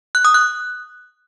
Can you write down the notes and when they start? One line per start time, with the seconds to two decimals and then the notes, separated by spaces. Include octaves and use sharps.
0.15 F#6
0.25 D#6
0.34 F#6